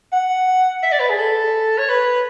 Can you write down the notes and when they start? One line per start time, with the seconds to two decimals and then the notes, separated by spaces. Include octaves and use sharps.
0.12 F#5
0.83 E5
0.92 D5
1.00 B4
1.09 G#4
1.18 A4
1.78 C#5
1.89 B4